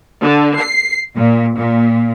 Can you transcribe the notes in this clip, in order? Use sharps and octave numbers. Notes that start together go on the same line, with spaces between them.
D3
C7
A#2
A#2